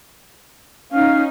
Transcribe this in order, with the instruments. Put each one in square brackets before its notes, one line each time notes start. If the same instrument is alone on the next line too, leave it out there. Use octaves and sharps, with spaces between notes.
[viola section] C#4 D#4 [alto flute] F5